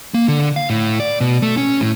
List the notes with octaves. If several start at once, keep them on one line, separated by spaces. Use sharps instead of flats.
A#3
D3
F5
A2
D5
B2
A3
C#4
A2